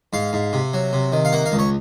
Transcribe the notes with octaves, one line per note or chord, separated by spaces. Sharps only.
G#2 F5
G#2
C3
F#3
C3
D#3
F5
A#3 F#5
F5
C#2
C#5